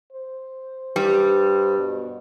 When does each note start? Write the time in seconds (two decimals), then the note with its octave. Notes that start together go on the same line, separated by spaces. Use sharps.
0.13 C5
0.96 G2 G3
1.77 B2